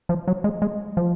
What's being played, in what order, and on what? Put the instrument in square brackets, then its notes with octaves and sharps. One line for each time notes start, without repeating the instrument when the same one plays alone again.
[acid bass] F3
F#3
G#3
G#3
F3